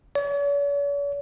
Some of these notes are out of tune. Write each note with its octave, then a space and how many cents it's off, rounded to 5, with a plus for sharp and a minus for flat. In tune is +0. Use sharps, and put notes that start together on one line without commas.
C#5 +45